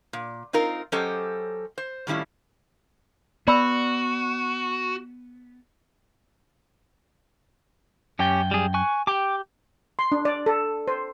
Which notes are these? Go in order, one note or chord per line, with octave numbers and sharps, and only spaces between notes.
A#2
C4 D#4 F4 A#4
F#3 C#4 G4 A4 C5 D#5
C5
A2 D#3 G3 C#4 E4 F4
B3 F#4 D5 B5 E6
F#2 C#4 G4 G5
G3 G#4
G#5 C#6 F#6
G4 G5 D6
C6
D4
D5
A4
C5